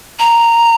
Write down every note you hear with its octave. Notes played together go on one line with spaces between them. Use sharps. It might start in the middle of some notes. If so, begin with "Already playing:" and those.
A#5